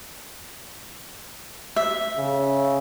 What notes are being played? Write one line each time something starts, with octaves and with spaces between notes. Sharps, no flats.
E5
C#3